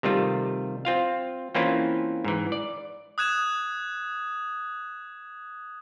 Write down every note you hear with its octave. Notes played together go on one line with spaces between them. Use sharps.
C3 D#3 G3 A3 F4
C4 F4 F5
E3 A#3 C4 C#4 E4 F4
G#2 E3
D5
D#6 F#6 G#6 E7